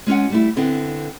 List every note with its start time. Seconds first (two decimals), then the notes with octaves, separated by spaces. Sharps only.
0.07 G#3 C#4 F4 F#5
0.30 G3 A3 E4
0.56 D3 B3 C4 E4